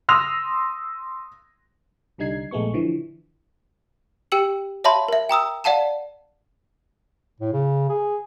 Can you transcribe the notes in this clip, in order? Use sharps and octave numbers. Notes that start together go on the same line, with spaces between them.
C6 D#6 E6 A#6 F7
C2 D3 G3 D#4 G#6 C7
A#1 G#3 A3 B3 C#6
D3 E3 F3
G4 G5 E6 C#7 F#7
C#5 E5 F5 A5 B5 C6
A#4 E5
G5 A#5 D#6 E6
D5 F5 F#5 A5 E7
A2
C#3
G#4